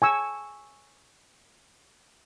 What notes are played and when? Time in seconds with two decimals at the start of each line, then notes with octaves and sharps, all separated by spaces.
0.02 G#5 C#6 E6